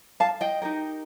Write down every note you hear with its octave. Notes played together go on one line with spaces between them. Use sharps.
F5 A5
D#5 G5
D#4 G4 A#4